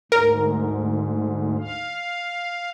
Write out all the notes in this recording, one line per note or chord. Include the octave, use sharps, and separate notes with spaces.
D2 G#2 A#4
F5